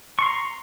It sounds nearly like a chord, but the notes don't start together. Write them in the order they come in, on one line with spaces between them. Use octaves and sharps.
C#6 C6 A#5